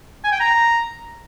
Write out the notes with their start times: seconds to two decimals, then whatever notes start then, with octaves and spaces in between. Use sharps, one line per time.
0.24 G#5
0.32 G5
0.40 A#5